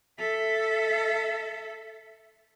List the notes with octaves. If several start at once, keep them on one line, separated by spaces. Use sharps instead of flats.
A4 E5